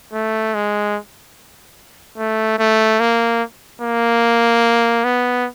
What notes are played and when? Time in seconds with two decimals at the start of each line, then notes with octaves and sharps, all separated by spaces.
0.13 A3
0.55 G#3
2.18 A3
2.59 A3
3.00 A#3
3.82 A#3
5.04 B3